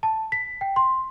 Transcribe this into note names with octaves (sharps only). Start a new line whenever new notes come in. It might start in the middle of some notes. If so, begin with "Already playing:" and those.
A5
B6
G5
C6